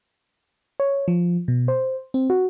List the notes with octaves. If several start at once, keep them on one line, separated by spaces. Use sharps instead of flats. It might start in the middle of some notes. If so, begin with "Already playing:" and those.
C#5
F3
B2
C5
C4
F#4